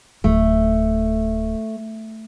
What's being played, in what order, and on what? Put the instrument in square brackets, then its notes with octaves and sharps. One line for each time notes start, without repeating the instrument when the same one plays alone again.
[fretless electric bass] D1 [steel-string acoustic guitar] A3